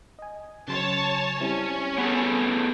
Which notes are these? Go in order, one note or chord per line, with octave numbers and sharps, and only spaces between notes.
D#5 G#5
C#3 F#3 C#5 A5 C6
G3 C4 C#4 E4
B3 G#4 A4